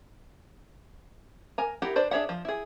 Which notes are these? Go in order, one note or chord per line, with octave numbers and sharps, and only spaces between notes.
A#4 G#5 A#5
D#4 E4 G4 A#4 F#5
D4 B4 C5 D5
D4 G#4 C#5 E5 F#5
F3
E4 G#4